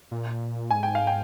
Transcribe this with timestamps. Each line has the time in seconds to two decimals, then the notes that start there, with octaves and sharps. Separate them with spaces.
0.11 A#2
0.71 G#2 G#5
0.83 G5
0.95 F5
1.07 G5